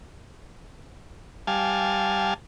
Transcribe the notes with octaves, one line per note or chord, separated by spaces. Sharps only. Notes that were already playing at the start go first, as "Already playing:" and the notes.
G3 F5 G#5 A5